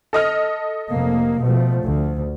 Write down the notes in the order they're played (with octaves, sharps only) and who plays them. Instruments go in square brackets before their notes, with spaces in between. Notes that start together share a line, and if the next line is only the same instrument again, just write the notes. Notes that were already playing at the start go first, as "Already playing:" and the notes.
[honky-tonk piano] A4 D#5 F6
[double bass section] F1 A#3
B2 F3 A3
D2